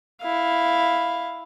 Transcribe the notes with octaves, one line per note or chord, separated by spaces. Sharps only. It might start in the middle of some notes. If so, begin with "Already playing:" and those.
E4 F5